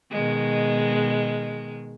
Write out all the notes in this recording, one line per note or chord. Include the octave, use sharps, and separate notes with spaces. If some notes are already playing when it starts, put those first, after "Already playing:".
B2 D#3 G#3